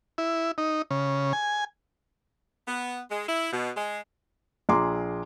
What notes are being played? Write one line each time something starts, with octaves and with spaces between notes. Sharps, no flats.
E4
D#4
C#3
G#5
B3
G#3
E4
B2
G#3
A#1 G#4 A#5 C6 D6